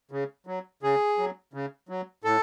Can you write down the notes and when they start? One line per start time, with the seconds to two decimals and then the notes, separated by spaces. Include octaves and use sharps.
0.11 C#3
0.47 F#3
0.83 C#3 G#4
1.18 F#3
1.53 C#3
1.89 F#3
2.24 A2 A4